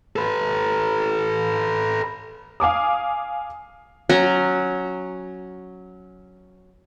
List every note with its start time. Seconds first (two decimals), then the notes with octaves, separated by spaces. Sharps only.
0.16 A4 B4
2.60 F5 G#5 D6 D#6
4.09 F#3 C#4 A#5